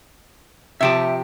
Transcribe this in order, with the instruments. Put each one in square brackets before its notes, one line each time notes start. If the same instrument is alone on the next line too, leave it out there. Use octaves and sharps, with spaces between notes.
[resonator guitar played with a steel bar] C3 F3 G4 [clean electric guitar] E5 G5 A5